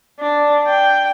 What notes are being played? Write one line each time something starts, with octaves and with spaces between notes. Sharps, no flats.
D4
G5